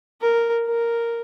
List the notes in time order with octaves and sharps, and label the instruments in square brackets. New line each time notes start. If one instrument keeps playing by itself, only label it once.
[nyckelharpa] A#4
A#4